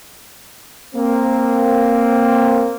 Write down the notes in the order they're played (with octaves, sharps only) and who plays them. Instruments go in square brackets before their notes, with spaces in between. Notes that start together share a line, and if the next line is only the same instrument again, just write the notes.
[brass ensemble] A#3 C4